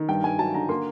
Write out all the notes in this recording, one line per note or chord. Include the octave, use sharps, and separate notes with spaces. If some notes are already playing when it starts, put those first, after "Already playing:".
Already playing: D#3
G2 G5
G2 G#5
F#3 A5
D3 A#5
A#3 C6